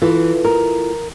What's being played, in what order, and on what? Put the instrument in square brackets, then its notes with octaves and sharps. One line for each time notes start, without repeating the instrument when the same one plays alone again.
[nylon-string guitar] E3 [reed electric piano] E4 F4 A4
[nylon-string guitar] A#4